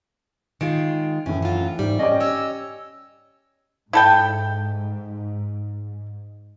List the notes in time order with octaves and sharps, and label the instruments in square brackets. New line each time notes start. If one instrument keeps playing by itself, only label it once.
[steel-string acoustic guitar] D#3 G#3 F4 [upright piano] D7
[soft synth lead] F#2 [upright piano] A2 E3 [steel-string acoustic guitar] C#4
[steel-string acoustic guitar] F#3 F4
[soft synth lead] G#2 [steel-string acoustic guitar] G3
[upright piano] C#4 G4 D5 [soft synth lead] D#5
[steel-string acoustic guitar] C#5 D#5 [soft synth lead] E6
[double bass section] G#2 [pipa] E4 A4 G5